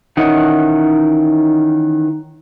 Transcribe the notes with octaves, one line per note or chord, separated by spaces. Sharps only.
D#3 E3 C#4 D#5 F#5